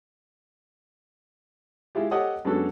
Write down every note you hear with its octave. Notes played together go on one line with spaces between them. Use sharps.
G#3 E4 F4 G4
G4 A4 C#5 D#5 F#5 D#6
F#2 G#3 B3 D4 F#4 A4